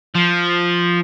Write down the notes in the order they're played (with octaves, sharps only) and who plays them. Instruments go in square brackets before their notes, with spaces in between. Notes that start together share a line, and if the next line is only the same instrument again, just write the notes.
[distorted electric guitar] F3